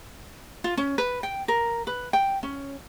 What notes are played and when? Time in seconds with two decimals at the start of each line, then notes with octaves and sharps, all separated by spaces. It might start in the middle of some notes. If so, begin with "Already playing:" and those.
0.64 F4
0.77 C#4
0.98 B4
1.23 G5
1.48 A#4
1.87 B4
2.13 G5
2.43 C#4